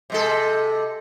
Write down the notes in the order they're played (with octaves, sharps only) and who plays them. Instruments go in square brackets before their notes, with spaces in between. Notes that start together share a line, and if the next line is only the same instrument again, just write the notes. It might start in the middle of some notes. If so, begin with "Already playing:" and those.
[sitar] C3 G#3 A4